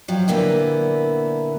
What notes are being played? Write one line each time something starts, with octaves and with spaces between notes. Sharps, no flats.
F3 F#3 G4
A#2 D3 A#3 B3 E4